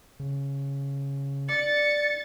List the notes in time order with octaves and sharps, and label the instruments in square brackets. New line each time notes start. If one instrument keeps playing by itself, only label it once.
[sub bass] C#3
[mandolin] D5 [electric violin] A6 [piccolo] C#7